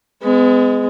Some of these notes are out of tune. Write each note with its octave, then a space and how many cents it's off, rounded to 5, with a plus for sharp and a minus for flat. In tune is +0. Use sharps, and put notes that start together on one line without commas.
G#3 +0 B3 +40